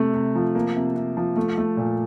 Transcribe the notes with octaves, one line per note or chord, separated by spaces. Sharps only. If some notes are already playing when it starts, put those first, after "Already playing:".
Already playing: C3 A3
C3
F3
A#3
C3
C3
F3
A3
A3
A#2